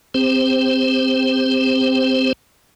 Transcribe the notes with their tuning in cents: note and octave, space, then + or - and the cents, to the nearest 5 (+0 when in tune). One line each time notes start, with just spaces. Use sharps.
C4 -10 G4 +40 C5 +0